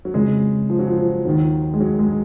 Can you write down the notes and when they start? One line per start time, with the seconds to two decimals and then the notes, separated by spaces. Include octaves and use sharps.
0.05 F#3
0.14 F2 C#3 G#3
0.70 F3
0.79 F#3
0.87 F3
0.97 F3
1.25 D#2 D#3 F#3
1.74 G#3
1.81 F#3
1.99 G#3